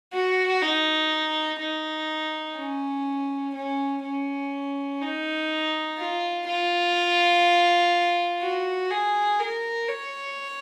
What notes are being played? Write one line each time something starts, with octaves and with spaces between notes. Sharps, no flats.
F#4
D#4
D#4
C#4
C#4
C#4
D#4
F4
F4
F#4
G#4
A#4
C#5